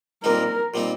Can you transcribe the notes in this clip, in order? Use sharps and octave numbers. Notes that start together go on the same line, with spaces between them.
A#2 G3 C4 D#4 A#4
A#2 G3 C4 D#4